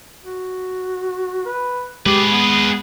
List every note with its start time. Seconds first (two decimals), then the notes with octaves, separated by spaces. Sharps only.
0.24 F#4
1.46 B4
2.06 G#3 G4 G#4 B4
2.30 B3